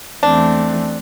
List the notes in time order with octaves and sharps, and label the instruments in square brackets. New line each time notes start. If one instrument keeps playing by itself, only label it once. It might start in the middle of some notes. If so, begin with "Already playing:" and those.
[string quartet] E2 E3 A3 C4 [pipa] D4